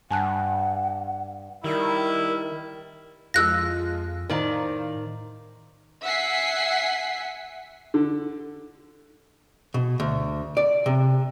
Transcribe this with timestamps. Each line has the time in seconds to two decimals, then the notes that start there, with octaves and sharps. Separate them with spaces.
0.11 G2 F#5 G#5 A5 F#6
1.64 D#3 G3 E4 A#4
3.34 F2 F3 G#3 F4 E6 F#6 A#6
4.30 A2 D#3 C5 D5 F5 A5 A#5
6.02 E5 F#5 G#5 B6 C7
7.94 D3
9.74 B2
10.00 D2
10.57 D5
10.86 C3